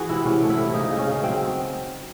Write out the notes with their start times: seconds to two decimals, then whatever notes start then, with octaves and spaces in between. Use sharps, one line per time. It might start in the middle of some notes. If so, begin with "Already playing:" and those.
Already playing: E3 F#4 G#4
0.09 C3 E4
0.25 C3 C#4
0.42 A3
0.50 E4
0.58 C3
0.74 C#3 D#4
0.91 C#3
0.98 C#4
1.07 C#3
1.23 F#3 C4